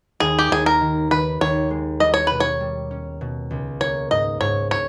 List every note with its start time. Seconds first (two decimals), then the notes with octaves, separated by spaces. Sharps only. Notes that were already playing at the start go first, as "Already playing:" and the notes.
0.20 D#2 G#4
0.39 G4
0.51 D#2 G#4
0.66 A#4
0.81 D#3
1.11 D#3 B4
1.41 D#2 C#5
1.70 G#3
2.00 G3 D#5
2.14 C#5
2.27 B2 B4
2.40 C#5
2.61 G3
2.91 C#4
3.21 B2
3.51 C#2
3.81 A#3 C#5
4.11 G#2 D#5
4.41 G#2 C#5
4.71 C#5